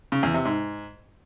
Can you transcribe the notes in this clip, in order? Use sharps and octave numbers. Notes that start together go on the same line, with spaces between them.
C#3
E2
C3
G#2